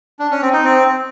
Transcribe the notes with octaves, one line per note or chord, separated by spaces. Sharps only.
D4
C#4
C4
D#4
C4